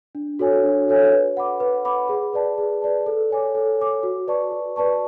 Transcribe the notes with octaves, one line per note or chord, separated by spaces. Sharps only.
D4
F#4 A4 C#5 G#5
D4
F#4 A4 C#5 G#5
B4
F#5 B5 D6
B4
F#5 B5 D6
G#4
B4 D5 A5
G#4
B4 D5 A5
A4
C#5 G#5 D6
A4
C#5 G#5 D6
F#4
B4 D5 A5 C#6
F#4
B4 D5 A5 C#6